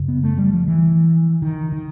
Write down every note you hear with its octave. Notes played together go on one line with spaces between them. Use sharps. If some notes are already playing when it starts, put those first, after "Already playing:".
Already playing: F#2 C#3
B3
A3
G3
F3
E3
D#3
D#3